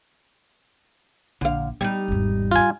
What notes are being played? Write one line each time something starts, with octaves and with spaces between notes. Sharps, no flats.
A#1 D3 F5
G3 B3 D#4
G#1 E2
F4 G#5